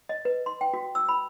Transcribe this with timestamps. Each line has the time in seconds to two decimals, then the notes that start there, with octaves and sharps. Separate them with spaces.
0.09 D#5
0.25 B4
0.46 C6
0.61 G5
0.74 F#4
0.95 E6
1.09 B5